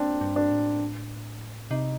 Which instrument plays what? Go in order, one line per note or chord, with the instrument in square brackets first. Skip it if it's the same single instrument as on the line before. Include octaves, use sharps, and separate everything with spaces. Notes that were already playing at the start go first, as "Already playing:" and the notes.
Already playing: [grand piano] A#3 C4 D4
[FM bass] G2
[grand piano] D4
[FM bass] A2
[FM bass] C3 [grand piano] D#4